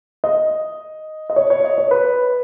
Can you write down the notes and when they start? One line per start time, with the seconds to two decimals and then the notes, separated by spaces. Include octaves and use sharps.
0.24 D#5
1.30 D#5
1.36 C#5
1.50 C#5
1.64 D#5
1.78 C#5
1.91 B4